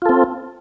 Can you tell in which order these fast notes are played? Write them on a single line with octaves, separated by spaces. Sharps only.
F4 A4 C4